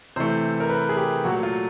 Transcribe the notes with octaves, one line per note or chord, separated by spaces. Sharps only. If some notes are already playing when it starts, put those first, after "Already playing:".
C3 E3 A3 C5
A#4
B4
G#4
G4
A#2 F#3 A3 F#4
F4